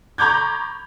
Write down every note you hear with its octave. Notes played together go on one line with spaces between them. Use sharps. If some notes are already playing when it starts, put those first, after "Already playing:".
A#5 B5 C#6 D6 G6 G#6